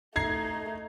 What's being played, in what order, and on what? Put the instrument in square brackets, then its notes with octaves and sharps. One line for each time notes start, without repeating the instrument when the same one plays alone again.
[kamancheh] A3 D#4 [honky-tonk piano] A#5 G#6 C7